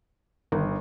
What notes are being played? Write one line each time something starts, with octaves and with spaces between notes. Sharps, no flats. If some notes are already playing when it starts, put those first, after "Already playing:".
G1 D#3